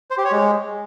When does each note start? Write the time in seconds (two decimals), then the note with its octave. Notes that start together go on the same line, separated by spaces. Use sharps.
0.11 C5
0.18 G4
0.25 C#5
0.32 G#3